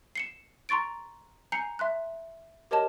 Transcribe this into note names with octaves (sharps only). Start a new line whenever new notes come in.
C7 C#7 E7
A#5 C6 C#6 A6 D7
G#5 A#5 G6 C7 C#7
E5 C6 F#6
G4 A#4 C#5 D#5 A5 E7